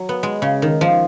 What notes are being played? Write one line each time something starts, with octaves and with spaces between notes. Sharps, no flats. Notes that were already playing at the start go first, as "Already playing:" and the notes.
Already playing: F#3
B3
G#3
C#3
D#3
F3